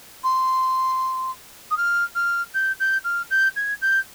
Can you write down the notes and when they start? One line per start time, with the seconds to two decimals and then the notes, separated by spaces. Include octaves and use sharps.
0.23 C6
1.71 D#6
1.77 F6
2.15 F6
2.54 G6
2.79 G6
3.04 F6
3.30 G6
3.56 G#6
3.81 G6